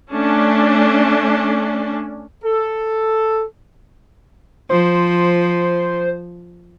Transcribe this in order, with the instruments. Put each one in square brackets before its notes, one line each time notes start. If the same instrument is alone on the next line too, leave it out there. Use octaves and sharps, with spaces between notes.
[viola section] A3 C#4 D4
[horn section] A4
[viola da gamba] F3 [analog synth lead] C5